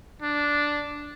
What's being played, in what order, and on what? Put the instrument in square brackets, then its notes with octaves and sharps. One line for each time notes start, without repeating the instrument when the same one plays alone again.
[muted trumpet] D4